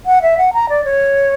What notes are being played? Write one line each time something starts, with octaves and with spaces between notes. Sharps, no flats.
F#5
E5
F#5
A#5
D5
C#5